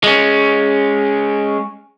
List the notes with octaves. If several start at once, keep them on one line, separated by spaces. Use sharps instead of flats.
G#3 C#4